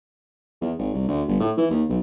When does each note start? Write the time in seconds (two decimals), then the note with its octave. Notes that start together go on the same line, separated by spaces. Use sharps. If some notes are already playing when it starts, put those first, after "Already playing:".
0.61 E2
0.78 G#1
0.93 C2
1.08 D2
1.28 G1
1.40 A2
1.58 E3
1.70 D#2
1.89 B1